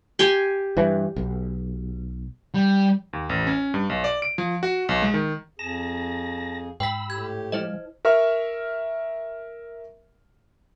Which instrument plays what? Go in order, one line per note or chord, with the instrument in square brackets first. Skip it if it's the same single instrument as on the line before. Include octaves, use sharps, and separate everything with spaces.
[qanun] G4 G#5 C6
[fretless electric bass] G2 E3
B1
[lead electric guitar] G3
[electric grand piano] D#2
A1
C#4
G2
B1
D5
D7
F3
F#4
B1
G#3
D#3
[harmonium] F2 G#4 [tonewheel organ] A5 A#6
[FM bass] G#2 [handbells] G5 B6 [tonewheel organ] B5 E6
[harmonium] A2 G4 [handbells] G#6
[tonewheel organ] F3 G#3 [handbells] E4 C5 D#5
[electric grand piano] A#4 E5 C#6 F6